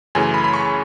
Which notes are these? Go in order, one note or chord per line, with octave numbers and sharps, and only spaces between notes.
F#2 C#3 E3 A3 G#5
B5
B5
C#6